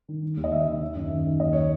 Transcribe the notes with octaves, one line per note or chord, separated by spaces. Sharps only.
D#3
D#3
D#2
D#5
D#2 E5
D#3
D#3
F#2
D#3
D#3
D#2 D#5
C#5